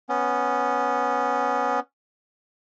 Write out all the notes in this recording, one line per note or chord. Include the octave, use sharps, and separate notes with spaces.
B3 C#4